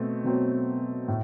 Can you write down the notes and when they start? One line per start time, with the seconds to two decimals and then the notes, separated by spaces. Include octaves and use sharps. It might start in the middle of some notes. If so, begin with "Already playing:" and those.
Already playing: B2 A3 C4
0.24 B2 F#3 C4
1.08 A2